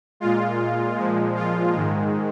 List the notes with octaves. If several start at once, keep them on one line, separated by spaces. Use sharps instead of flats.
A#2 G#3 F4
A#2 F3 G#3
F4
G#2 D#3 G#3